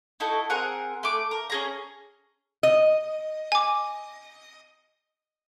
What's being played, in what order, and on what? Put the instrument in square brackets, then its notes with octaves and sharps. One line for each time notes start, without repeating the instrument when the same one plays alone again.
[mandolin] D#4 E4 F#4 A4
C4 G#4 A#4 F#5
A3 D6
A#4
C#4 G#4 A#5
[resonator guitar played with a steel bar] D#5
[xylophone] G#5 D6